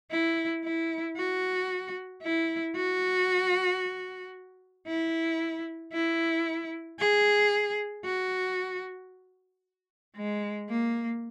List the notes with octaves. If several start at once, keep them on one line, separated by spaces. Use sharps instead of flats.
E4
E4
F#4
E4
F#4
E4
E4
G#4
F#4
G#3
A#3